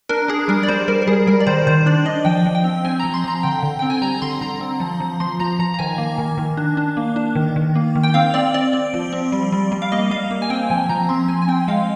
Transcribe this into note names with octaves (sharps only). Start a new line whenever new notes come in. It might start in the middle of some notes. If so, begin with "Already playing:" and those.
D4 A#4
D4 G#4
G3 A#4
D5
G3 C5
G3 A#4
A#4
G3 G#4
G3 A#4
D5
D#3 C5
D#3 C5
D4 D5
D4 D#5
F3 G5
F3
G5
C4
C4 G#5
F3 A#5
C6
F3 A#5
D3 G5
D3
C4 G5
G#5
G3 A#5
D3 C6
D3 A#5
C4
F3
F3
F3 C6
F3 A#5
F3 A#5
A#5
D#3 G#5
A#3
D#3
D#3
D4
D4
A#3
D4
D#3
D#3
A#3
D#3
G5
C4 F5
C4 D5
C4 D5
C4
F3
C4
G3
G3
G3
F5
A#3 D#5
G3 F5
A#3
G#5
C4 G5
F3 G#5
F3 A#5
C4 C6
F3 G#5
G#5
C4 G5
G#3 F5